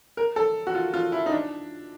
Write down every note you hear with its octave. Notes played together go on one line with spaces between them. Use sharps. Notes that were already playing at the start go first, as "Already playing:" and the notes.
A#4
A4
F#4
F4
F4
E4
D#4
D4